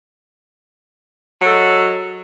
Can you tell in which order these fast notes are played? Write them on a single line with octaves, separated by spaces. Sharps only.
F#3 A4 G#3